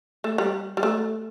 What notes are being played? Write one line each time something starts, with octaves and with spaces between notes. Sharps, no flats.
A3
G3
G3
A3